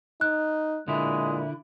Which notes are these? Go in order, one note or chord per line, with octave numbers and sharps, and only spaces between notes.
D#4 F#6
A#2 D3 G#3 E4